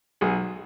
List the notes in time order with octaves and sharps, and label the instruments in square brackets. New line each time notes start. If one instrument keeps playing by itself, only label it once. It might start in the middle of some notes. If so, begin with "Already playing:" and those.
[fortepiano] B1 G#4